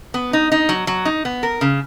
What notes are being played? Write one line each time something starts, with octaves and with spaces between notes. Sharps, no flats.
B3
D#4
D#4
F#3
F#3
D#4
B3
A#4
C#3